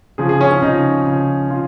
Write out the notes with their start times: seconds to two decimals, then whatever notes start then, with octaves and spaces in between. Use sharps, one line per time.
0.18 C#3 F3 G#4
0.29 G#4
0.41 C#4
0.51 C#4
0.62 C#3 F3 D#4
1.06 C#3 F3
1.50 C#3 F4